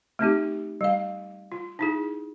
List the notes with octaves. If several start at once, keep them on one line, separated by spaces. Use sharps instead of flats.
A3 C4 D#4 G4
G3 F5
F4
D#4 E4 G#4